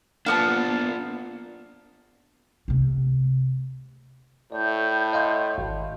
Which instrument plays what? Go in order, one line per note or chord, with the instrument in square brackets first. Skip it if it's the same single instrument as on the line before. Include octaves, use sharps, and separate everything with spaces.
[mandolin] A#3 B3 A5 [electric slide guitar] D4 F4
[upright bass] C3 A3
[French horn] A2 [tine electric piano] D5 [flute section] G6
[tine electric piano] D#5 F5 C6
G#1